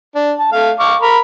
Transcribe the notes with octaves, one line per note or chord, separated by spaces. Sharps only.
D4
A5
A3 F5
F5 C#6 D6
A#4 B5